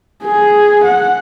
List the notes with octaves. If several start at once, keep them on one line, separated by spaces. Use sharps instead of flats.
G#4
F#5